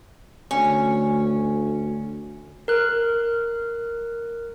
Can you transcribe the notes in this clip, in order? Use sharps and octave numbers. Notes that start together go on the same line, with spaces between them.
D2 C#4
A#4 F#6